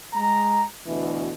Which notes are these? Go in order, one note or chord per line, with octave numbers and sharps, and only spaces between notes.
G#3 A#5
D2 B2 E3